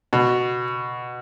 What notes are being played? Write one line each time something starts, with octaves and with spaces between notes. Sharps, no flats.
B2